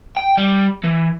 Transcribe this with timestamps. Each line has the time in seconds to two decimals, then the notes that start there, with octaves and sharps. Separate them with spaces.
0.17 G5
0.37 G3
0.84 E3